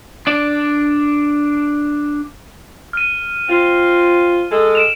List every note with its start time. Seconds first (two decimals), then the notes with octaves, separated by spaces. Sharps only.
0.27 D4 D5
2.93 F6 D#7
3.49 C4 F4
4.51 G#3 A4
4.75 D7 E7 F7